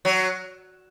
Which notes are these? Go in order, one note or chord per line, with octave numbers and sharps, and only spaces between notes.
F#3